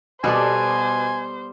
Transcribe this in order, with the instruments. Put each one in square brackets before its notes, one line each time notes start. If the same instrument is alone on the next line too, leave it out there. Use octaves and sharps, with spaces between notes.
[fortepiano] B2 D5 [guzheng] G3 B3 A4 [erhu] C5 [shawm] G#5